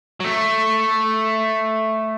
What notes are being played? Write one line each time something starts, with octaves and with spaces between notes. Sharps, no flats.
F#3
A3